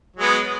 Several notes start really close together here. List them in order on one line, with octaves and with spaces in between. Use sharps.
F#3 G#3 B3